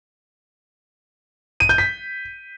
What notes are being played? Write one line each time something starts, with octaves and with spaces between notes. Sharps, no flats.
D#7
G6
B6